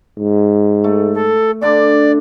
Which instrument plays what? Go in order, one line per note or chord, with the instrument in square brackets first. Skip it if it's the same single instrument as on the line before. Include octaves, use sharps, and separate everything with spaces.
[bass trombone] G#2
[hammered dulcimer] A3
[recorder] A4
[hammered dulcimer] D3 D4 D6 [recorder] D5